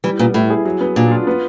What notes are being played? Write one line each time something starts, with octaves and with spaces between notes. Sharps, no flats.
E3 G3
A#2 B3
A2 E4
G#4
F#3
B3
A#2 D4
F4
B3